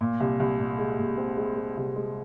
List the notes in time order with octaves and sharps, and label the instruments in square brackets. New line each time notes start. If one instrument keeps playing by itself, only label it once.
[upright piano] A#2
C2
C2
A#2
G#3
A#2
C4
G#3
G#3
C2
G#3